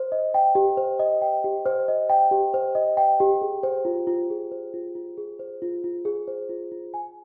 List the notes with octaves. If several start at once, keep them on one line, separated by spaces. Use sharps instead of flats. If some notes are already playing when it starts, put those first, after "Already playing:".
Already playing: C5
D#5
G5
G4
C5
D#5
G5
G4
C5
D#5
G5
G4
C5
D#5
G5
G4
G#4
C5
F4
F4
G#4
C5
F4
F4
G#4
C5
F4
F4
G#4
C5
F4
F4
G#5